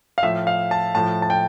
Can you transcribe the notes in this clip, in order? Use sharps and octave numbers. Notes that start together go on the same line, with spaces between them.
F5
A2 F3 E5
F5
A5
A2 F3 A5
A5
G5